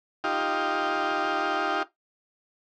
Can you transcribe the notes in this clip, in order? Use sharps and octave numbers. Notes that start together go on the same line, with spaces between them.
D#4 F4 G4